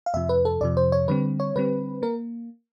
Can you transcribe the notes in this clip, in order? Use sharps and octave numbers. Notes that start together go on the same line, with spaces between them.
F5
F2 C3 F3 E5
B4
A4
F2 C3 F3 D5
C5
C#5
D3 G3 C4 B4
C#5
D3 G3 C4 B4
A#3 A#4